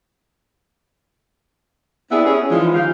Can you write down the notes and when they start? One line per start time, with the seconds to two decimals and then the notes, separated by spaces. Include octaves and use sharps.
2.11 B3 C4 D4 E4 G4 G#4
2.25 C#4 G#4
2.51 E3 F3 G#3 D#4 F4
2.74 D#3 F3 G4 F5